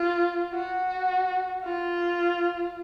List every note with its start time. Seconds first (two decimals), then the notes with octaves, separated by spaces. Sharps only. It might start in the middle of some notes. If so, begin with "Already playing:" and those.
Already playing: F4
0.54 F#4
1.65 F4